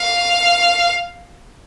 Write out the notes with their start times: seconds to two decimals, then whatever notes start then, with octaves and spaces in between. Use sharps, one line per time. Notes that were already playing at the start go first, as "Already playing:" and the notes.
Already playing: F5